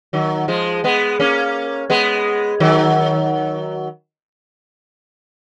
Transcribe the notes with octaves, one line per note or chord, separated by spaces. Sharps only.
D#3 F#3
F3 G#3
G#3 B3
A#3 C#4
G#3 B3
D#3 F#3